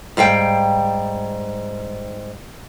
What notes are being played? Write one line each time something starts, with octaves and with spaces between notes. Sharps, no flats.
G#2 G3 F5 G5